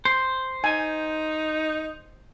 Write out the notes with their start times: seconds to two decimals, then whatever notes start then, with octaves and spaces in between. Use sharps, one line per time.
0.05 C5
0.64 D#4 G#5